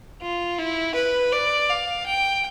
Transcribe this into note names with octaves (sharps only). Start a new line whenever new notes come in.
F4
E4
B4
D5
F5
G5